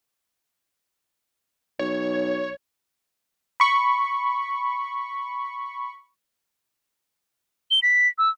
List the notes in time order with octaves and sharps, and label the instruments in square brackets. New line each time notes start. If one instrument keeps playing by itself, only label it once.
[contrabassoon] B1 [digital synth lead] C#5
[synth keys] B5 C#6
[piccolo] G7
B6
E6